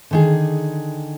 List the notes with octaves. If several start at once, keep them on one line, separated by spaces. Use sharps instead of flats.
D3 D#3 G#4